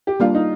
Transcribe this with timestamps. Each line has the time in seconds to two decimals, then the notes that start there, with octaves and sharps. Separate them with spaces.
0.07 G4
0.20 G3 A#3 D4 F4
0.35 D#4